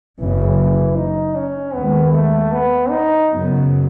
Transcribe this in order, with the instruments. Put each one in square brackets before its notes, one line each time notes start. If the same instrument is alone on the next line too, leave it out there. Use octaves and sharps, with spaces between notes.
[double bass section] F#1 F#2 C#3 [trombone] E3
[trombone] D#4
C#4
[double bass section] D#2 D#3 G#3 [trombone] B3
[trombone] A3
B3
D#4
[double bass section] F#2 C#3 F#3 B3